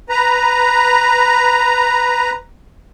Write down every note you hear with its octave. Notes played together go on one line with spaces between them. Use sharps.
B4 A#5